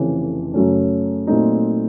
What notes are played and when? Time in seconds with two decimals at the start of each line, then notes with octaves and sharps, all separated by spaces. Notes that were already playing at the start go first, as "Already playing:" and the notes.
Already playing: F1 F2 C#3 E3
0.54 F#2 C#3 F#3 A3 C#4
1.27 A#2 F#3 A3 C4 D#4